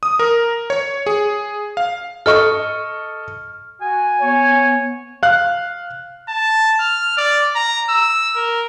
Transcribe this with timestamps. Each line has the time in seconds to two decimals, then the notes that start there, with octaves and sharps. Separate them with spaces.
0.03 D#6
0.19 A#4
0.70 C#5
1.06 G#4
1.77 F5
2.26 A4 D#5 C#6 F6
3.82 F#4 G#5
4.21 B3 C#5
5.23 F5 F#6
6.29 A5
6.81 F6
7.18 D5
7.56 A#5
7.89 E6
8.36 A#4